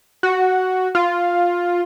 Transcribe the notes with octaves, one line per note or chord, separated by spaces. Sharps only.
F#4
F4